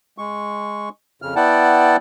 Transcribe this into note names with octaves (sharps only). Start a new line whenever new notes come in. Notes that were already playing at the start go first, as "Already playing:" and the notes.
G#3 C#6
F2 C#3 F6
B3 E4 D5 F#5 G5 A5